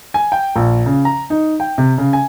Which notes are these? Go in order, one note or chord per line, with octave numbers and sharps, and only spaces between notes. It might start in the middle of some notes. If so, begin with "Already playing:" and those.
G#5
G5
A#1
C#3
A#5
D#4
G5
C3
C#3
G#5